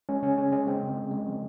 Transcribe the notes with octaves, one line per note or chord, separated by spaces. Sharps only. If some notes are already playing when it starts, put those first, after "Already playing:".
G#3 C#4
C#3 C#4
C#3 C#4
G#3 C#4
G#3 C4
C#3
C#3
G#3
F3